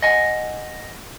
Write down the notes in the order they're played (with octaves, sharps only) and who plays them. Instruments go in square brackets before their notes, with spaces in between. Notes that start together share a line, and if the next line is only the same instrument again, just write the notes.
[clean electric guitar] D#5 F#5 G#5